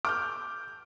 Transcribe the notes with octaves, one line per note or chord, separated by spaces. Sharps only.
D6 F6 G6